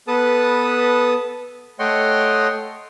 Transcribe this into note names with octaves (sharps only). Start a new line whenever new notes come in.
B3 A4 B4 A5 D#6
A3 C#5 D#5 F#5 G5 C6